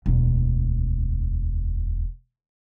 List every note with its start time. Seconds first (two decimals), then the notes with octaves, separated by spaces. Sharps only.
0.06 E1 D2